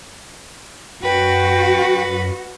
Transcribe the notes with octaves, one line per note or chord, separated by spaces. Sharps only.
F#2 F#4 B4 G5